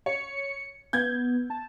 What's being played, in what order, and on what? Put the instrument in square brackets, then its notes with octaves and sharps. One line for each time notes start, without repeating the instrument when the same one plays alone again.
[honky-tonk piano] C#5 [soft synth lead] C#7
[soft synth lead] B3 [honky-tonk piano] G6 G#6
[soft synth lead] A5